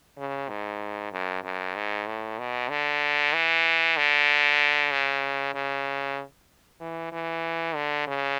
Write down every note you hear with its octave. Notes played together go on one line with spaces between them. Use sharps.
C#3
G#2
F#2
F#2
G#2
A2
B2
D3
E3
D3
C#3
C#3
E3
E3
D3
C#3